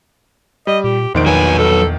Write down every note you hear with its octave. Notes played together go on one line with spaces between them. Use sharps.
G3 D#5
A#2 G4
A#1 E2 D#3 C5 D7
F#3 F#4 B4 G#5
A4